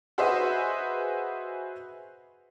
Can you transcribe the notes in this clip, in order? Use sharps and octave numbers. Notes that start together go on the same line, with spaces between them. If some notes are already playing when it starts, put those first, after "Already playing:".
F#4 G#4 B4 C5 D#5 E5